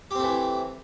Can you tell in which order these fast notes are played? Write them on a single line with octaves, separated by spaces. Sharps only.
G4 C4 A3 E3